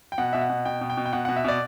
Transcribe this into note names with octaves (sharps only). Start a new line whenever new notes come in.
G5
B2 F#5
B2 E5
F#5
B2
B2 G5
B2
G5
B2
G5
B2 F#5
B2 F#5
E5
B2 D5